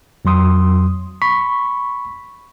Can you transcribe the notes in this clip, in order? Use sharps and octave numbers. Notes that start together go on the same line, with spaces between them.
F2 F#3 C6 D#6
B5 C#6 B6